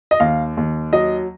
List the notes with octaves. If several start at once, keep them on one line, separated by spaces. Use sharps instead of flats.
D#5
D#2 F5
D#2
F#3 D#5